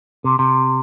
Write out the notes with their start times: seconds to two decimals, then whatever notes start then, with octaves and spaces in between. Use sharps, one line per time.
0.24 C3
0.39 C3